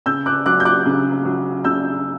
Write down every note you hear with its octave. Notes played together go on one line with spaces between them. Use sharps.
C#3 E6 G6
D6 F#6
F#3 D6 F#6
G6
D6 F#6
C#3
F#3
C#3 E6 G6